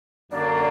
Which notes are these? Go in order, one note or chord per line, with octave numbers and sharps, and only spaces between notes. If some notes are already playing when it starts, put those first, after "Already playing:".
F#2 D3 F#3 A#3 D4 D5